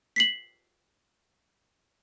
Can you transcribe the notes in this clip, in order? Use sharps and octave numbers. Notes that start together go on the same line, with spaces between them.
B6 C7 F#7